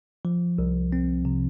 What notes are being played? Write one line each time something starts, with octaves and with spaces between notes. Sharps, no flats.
F3
C2
C4
C3